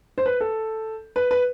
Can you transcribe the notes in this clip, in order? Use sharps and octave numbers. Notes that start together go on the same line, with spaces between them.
C5
B4
A4
B4
B4